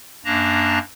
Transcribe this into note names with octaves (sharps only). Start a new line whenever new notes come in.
F#2 A#3 D4 A5 A#5 A#6